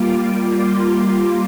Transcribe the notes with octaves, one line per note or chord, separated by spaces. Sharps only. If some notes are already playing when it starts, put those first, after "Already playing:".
Already playing: G3 A#3 F4 D6
C6